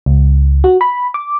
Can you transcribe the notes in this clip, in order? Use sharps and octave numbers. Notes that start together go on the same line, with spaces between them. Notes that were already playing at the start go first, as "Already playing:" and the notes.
C#2
F#4
B5
D6